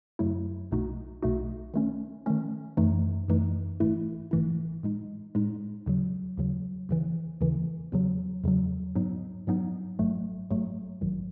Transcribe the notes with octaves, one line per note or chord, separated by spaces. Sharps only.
F#2 C#3 F#3 A3 E4
B1 B2 A3 D#4 F#4
B1 B2 A3 D#4 F#4
D#3 A3 C#4
D#3 A3 C#4
F#2 E3 A3 D#4
F#2 E3 A3 D#4
G#1 G#2 E3 A3 E4
G#1 G#2 E3 A3 E4
A2 G#3 D#4
A2 G#3 D#4
D#2 C#3 F#3
D#2 C#3 F#3
D#2 C#3 E3
D#2 C#3 E3
E2 C#3 F#3
E2 C#3 F#3
G#2 F#3 B3 D#4
G#2 F#3 B3 D#4
G#1 G#2 F#3 A3
G#1 G#2 F#3 A3
A1 G#2 D#3 F#3